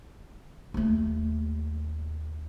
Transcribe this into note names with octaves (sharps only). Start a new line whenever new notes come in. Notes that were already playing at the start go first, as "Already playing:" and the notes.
D#2 A3